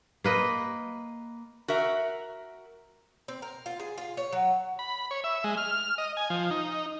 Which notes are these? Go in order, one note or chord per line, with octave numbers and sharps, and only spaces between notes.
A#3 B4 D#5
F#4 A#4 E5
C4
A#4
F4
G#4
F4
C#5
F#3
B5
C#5
E5
G#3
F6
D#5
G#5
F3
D#4